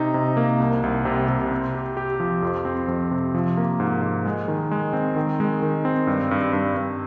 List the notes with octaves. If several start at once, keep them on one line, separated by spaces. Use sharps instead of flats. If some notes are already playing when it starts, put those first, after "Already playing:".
Already playing: C3 D#4
C3
A#3
C2
C2
C3
C3
C4
G4
G4
F3
F2
C4
F2
C3
F3
A#3
G#2
G#2
G#3
D#3
G#3
C4
D#3
G#3
D#3
C4
G2
G2
G2
G2